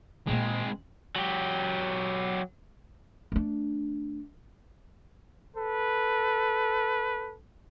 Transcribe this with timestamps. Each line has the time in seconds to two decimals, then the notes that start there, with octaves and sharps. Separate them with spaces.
0.27 A#2 G#3 A#3 C4
1.16 F#3 G4
3.32 A3 D4
5.56 A4 B4